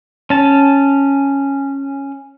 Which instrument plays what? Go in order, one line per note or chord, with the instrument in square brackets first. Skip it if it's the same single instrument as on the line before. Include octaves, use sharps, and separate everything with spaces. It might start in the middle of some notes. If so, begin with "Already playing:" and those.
[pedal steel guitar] C#4 A5